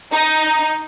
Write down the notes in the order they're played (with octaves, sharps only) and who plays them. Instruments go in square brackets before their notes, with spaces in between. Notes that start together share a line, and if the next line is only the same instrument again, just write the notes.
[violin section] D#4